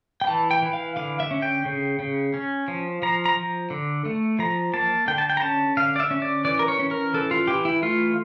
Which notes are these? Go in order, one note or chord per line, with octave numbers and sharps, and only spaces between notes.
G5
E3 A5
G5
E3
F5
D3 F5
E5
C#4
G5
C#3
C#3
C#4
F3
F3 A#5
A#5
F3
D3
A3
F3 A#5
A#3 A5
D3 G5
A5
G5
A#5
C#4 A5
D3 F5
D5
E5
C#4
D5
E3 D5
A#4
C#5
C#4
A#4
E3 A4
F4
E3 G4
E4
A3 F4